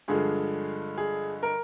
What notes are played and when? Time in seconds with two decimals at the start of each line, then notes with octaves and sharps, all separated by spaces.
0.08 G2 D3 F3 G#3 G#4
0.98 G#4
1.43 A#4